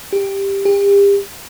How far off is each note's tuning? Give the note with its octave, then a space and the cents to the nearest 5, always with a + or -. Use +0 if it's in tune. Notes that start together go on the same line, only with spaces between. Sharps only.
G4 +5
G4 +35